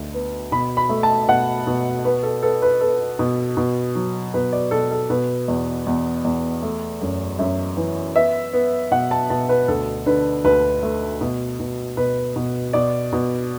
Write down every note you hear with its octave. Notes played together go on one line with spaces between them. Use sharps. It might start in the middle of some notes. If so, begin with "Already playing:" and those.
Already playing: D2
B3
B2 B5
B5
A3
A5
B2 F#5
B2
B3 B4
A4
B3 A4
B4
B3 A4
B2
B2
F#3
B2 B4
D5
B2 A4
A4
B2 B4
E2
E2
E2
A3
F#2
F#2 E5
E3
B3 E5
B3
B2 F#5
A5
B2 A5
B4
D2 A4
D3 B4
D2 B4
A3
B2
B2
B2 B4
B2
B2 D5
B2